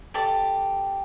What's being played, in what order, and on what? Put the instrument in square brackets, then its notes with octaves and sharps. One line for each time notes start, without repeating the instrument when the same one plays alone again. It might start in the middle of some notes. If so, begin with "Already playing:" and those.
[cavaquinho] G4 A4 D5